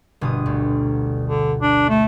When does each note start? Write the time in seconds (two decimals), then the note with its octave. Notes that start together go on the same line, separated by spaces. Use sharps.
0.21 G1 B2 D#6
0.46 D2
1.25 D3
1.62 D4
1.89 A3